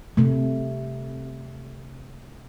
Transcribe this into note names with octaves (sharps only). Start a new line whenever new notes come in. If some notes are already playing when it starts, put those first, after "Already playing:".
C3 A3